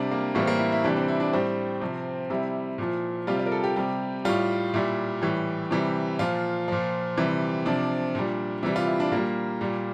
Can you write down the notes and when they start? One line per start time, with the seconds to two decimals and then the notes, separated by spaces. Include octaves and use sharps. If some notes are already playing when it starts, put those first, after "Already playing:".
Already playing: C3 G3 D4
0.11 A#3
0.35 A2 E3 G3 A#3
0.42 C4
0.47 A#3
0.59 E4
0.72 E4
0.84 C3 E3 G3 D4
0.97 C4
1.08 E4
1.20 D4
1.33 A2 G3 C4
1.81 C3 F3
2.30 C3 G3 E4
2.78 A#2 F3
3.27 C3 G3 F4
3.39 F4
3.46 A#4
3.52 A4
3.64 G4
3.76 C3 G3
4.25 A2 G3 F4
4.74 A#2 G3 E4
5.22 A2 E3 G3
5.71 C3 E3 G3
6.19 A#2 F3 F4
6.68 A#2 F3
7.17 C3 E3 G3
7.66 C3 F3 D4
8.15 A#2 G3
8.63 C3 E3 G3 E4
8.76 F4
8.87 E4
9.00 D4
9.12 A#2 G3 A#3
9.61 A#2 G3